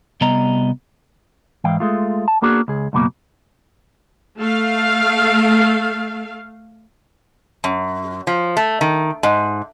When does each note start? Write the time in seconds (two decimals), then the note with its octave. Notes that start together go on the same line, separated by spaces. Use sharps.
0.21 C3 G3 B3 D#5 A#5
1.64 G#2 E3 F5 G5
1.80 G#3 A3 F4
2.28 A5
2.42 A#3 B3 D4 F#4 G#4
2.68 C#2 G#4
2.93 C#2 F#2 B2 A#3
4.38 A3 F5
7.64 F#2
8.27 F3
8.57 A3
8.81 D#3
9.23 G#2